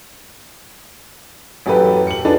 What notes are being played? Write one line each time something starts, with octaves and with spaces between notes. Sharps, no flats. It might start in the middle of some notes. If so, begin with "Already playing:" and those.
A1 F#2 G4 A4 B4
C#7 F#7
D4 D#4 F4 G#4 A4 B4